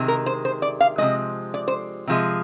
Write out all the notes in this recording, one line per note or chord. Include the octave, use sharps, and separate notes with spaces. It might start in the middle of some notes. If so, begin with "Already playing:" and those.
Already playing: C3 D#3 G#3
A#4
C5
C5
D5
F5
C3 F3 G#3 D#5
D5
C5
C3 F3 G#3